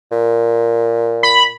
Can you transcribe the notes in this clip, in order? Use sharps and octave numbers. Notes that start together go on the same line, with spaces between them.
A#2
B5